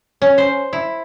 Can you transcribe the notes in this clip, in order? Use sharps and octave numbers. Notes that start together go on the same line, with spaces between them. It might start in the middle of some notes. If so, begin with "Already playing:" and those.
C#4
C5
E4